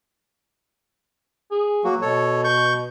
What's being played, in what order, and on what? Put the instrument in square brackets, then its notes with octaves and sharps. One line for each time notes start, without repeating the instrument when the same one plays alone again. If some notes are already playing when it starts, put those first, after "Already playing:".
[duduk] G#4
[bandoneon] F#3 A#3 F#4
[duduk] B2 [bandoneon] A4 C#5
[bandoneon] C#6 G6